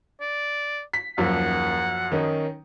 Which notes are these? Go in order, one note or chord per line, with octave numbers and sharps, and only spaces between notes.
D5
B6
D#1 F#2 F3 F#5
D#3 C#4 D#4